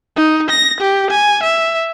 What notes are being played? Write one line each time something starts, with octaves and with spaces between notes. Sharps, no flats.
D#4
A#6
G4
G#5
E5